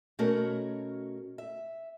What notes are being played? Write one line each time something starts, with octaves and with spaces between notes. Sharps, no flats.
B2 A3 C#4 F#4 A#4 C#5
E5